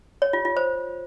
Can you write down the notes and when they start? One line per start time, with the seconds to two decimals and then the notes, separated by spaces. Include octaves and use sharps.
0.22 C#5
0.33 F4
0.45 F4
0.57 C5